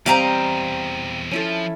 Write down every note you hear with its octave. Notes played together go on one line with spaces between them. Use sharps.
E2 G3 C4 D#5 F5 G5 A#5
F3 C#4 E4 A4